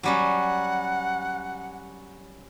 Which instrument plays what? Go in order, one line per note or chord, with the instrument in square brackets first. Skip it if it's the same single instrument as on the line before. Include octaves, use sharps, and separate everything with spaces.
[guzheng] F#3 G3 C#4 [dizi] F#5